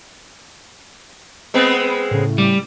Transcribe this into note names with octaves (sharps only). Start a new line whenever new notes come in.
G#3 B3 C4 B5 E6
A2 C#3
G3